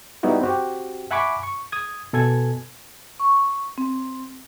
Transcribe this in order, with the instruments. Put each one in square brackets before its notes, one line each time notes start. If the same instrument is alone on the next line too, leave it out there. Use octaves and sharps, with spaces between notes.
[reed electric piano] G3 B3 D#4 E4 F#4
C4 F#4 G4
E5 F#5 G#5 B5 C#6 D6
C#6
D#6 G#6
B2 A4 G#5 G#6
[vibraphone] C#6
C4